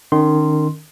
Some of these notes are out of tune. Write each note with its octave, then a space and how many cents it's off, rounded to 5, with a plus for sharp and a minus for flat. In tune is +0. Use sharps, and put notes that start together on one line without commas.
D#3 -25 C#4 +0 C6 +0